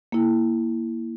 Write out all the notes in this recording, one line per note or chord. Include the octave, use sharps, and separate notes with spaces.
A#3 E4